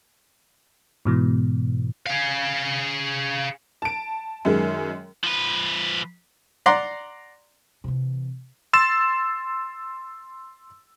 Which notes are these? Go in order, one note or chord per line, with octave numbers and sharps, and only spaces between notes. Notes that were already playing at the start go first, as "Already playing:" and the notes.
G#2 B2 E3
G#4 F5
A5 D7
F#2 D#3 G#3
F3 B4
D5 F#5 A#5 C6
C3 E3
C6 E6 A6 E7